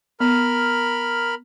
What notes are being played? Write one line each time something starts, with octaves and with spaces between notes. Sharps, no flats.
B3 A#4 B5 F6